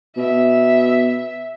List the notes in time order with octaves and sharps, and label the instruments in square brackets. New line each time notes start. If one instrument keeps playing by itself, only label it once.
[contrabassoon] B2 [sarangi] E5